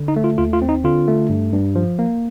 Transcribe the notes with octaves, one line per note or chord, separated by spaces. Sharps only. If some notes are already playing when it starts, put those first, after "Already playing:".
Already playing: D3
D#4
A3
F4
D#2 F4
F4
C4
D#4
D3 F4
A3
G2
G2
F3
A#3